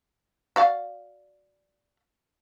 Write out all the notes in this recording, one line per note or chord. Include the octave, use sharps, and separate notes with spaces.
F#4 D5 F5